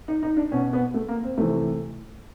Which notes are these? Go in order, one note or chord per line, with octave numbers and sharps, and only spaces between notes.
D#4
D#4
D4
B2 C#4
B3
A3
A#3
C4
C3 E3 A3